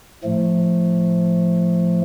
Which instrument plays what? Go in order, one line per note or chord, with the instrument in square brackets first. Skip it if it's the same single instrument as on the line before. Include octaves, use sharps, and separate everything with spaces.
[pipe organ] A2 F3 A3